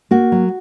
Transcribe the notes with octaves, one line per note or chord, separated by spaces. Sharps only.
A#3 F#4
F#3